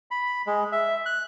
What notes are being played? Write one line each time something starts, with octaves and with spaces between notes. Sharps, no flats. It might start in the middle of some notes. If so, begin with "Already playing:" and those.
B5
G#3
E5
F#6